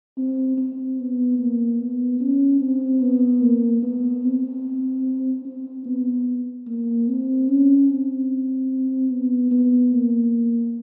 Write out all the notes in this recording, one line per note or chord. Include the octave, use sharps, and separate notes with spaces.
C4
C4
B3
A#3
B3
C#4
C4
B3
A#3
B3
C4
C4
B3
A#3
C4
C#4
C4
B3
B3
A#3